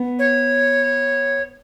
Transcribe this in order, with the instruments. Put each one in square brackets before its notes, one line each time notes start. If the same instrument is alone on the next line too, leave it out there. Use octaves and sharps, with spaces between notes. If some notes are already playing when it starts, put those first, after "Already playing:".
Already playing: [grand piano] B3
[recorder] C#5